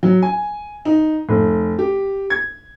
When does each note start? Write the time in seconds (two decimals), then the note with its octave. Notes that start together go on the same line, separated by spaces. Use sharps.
0.03 F#3
0.22 G#5
0.85 D#4
1.29 F1
1.79 G4
2.30 G#6